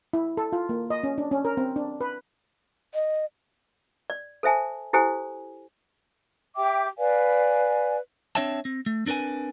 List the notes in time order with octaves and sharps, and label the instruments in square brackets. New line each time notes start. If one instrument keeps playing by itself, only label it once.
[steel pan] E4
A4
F4
A#3
D#5
C#4
D4
C#4
A#4
C4
D4
B4
[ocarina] D#5
[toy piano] D5
A4 C5 E5 G#5 A5
E4 G4 A4 C5 G#5
[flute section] G4 E5 G5 D6
B4 D5 F5 G#5
[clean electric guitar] C4 D4 C#5 E5 G5 A5
C4
A3
C4 D4 A#4 B4 G#5